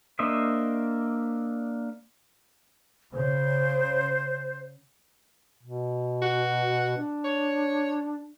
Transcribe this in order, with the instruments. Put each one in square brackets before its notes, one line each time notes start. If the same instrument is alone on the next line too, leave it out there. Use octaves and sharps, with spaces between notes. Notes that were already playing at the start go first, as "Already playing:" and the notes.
[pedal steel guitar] A#3 D4 C5 D#5 E5
[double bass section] C#3 [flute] C5
[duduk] B2
[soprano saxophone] F#4
[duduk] D4
[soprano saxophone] C#5